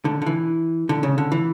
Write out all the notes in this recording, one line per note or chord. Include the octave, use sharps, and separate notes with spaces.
D3
D3
E3
D3
C#3
D3
E3